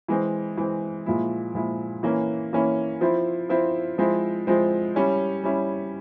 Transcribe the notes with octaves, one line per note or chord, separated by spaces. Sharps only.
E3 G#3 C4
E3 G#3 C4
A#2 F3 G#3 E4
A#2 F3 G#3 E4
E3 A#3 C#4 E4
E3 A#3 C#4 E4
F3 C4 E4
F3 C4 E4
F3 G#3 C4 E4
F3 G#3 C4 E4
G3 C#4 E4
G3 C#4 E4